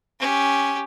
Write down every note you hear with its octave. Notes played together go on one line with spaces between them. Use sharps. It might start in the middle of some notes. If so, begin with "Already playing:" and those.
C#4 G4